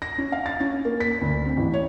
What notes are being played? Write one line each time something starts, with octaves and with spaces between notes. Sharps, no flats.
A#6
C#4
F5
A6
C#4
A#3
B6
D2
C4
A1
C#5